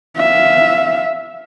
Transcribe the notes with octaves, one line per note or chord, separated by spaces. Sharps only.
E5 F5